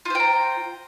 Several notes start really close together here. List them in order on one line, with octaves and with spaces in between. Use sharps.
F4 C5 G5 A#5